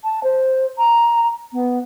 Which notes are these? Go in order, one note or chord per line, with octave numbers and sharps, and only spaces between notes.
A5
C5
A#5
B3